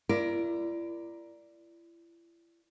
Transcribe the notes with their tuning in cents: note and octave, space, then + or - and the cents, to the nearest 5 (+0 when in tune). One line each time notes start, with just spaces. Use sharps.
E4 +40 A#4 +10 D5 +0